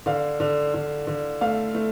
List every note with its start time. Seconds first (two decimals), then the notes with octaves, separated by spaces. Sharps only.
0.06 D3 F5
0.40 D3
0.74 D3
1.07 D3
1.41 A3 F5
1.74 A3